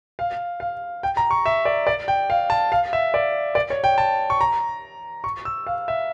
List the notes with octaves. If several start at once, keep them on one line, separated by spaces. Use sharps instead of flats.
F5
F5
G5
A#5
C#6
E5
D5
D5
G5
F5
A5
F5
E5
D5
D5
C#5
G5
A5
C#6
A#5
C#6
E6
F5
E5